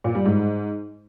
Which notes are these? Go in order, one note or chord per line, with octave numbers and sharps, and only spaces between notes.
A#2
G3
G#2